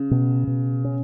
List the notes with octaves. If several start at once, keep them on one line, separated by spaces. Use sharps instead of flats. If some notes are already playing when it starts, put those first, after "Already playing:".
Already playing: C#3
B2
B2
C#4